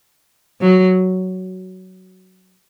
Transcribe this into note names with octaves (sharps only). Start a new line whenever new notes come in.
F#3